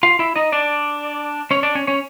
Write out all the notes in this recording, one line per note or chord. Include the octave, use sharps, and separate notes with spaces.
F4 F5
E4 E5
D#4 D#5
D4 D5
C#4 C#5
D4 D5
C#4 C#5
C#4 C#5